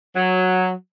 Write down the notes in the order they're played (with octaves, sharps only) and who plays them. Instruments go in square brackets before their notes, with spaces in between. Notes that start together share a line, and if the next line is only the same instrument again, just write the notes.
[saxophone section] F#3